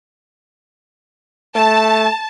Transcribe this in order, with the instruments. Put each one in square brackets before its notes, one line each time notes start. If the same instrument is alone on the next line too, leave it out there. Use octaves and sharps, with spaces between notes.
[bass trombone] A3 [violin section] A5